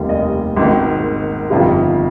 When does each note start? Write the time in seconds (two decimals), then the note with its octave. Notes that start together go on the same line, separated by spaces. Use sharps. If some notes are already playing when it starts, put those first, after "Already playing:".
Already playing: F1 D#2 D#3 G3 A#3 F5
0.09 D#5
0.57 G#1 G#2 D#3
1.50 G1 F2 D#3 F5